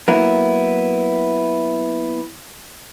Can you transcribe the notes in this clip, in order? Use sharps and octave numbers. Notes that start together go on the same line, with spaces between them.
F#3 A#3 B3 E4